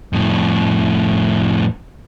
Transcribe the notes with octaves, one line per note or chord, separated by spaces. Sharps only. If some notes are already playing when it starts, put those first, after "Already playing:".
F2 A2